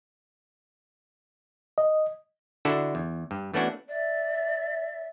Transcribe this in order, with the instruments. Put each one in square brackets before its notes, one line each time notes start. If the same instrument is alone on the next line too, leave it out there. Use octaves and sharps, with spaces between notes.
[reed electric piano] D#5
[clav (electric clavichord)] D3 D4 E4 F#4 A4
E2
G2
E3 A3 B3 C#4 D4 F#4
[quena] D5 [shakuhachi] E5